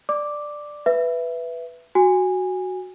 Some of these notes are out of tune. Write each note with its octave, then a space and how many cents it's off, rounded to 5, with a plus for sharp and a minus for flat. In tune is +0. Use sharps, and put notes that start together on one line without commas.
D5 +10 D6 +0
B4 +0 E5 +15
F#4 +0 G#5 -20